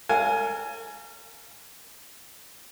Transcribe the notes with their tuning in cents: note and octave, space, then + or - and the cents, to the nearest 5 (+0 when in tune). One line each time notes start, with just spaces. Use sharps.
A#4 -45 F5 +0 G#5 +10